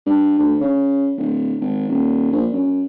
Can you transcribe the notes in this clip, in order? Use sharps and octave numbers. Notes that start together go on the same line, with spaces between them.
G2
D2
C#3
D1
G#1
D#1
A#1
F#2